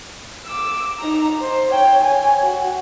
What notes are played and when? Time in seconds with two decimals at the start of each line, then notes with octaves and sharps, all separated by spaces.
0.46 D6 E6
0.99 D#4 A#5
1.41 C5
1.70 C#5 G5
2.03 C#5 G#5
2.44 F#4